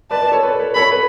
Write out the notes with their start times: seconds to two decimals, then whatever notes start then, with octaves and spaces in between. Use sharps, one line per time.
0.11 B4 D5 A5
0.21 B4 D5
0.32 A4 C#5
0.43 B4
0.59 B4
0.75 A4 C#5 B5
0.92 B4